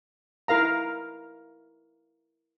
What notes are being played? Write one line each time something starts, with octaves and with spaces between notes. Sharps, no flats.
E4 A#4 F5 A#5